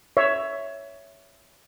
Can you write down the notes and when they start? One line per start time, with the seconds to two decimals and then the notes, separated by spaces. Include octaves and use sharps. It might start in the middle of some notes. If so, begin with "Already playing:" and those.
0.17 C#5 E5